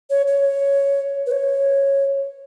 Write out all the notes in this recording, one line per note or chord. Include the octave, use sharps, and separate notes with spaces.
C#5
C#5
B4
C#5